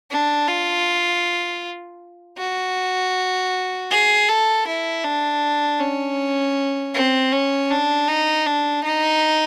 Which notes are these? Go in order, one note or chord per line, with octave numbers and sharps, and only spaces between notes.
D4
F4
F#4
G#4
A4
E4
D4
C#4
C4
C#4
D4
D#4
D4
D#4